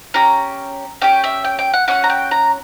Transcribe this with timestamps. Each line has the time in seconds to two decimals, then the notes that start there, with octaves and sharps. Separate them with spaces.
0.14 C#4 G4 A#5
1.02 C#4 G4 G5
1.24 E5
1.45 G5
1.59 G5
1.74 F#5
1.88 C#4 F#4 F#5
2.04 A#5
2.10 G5
2.31 A#5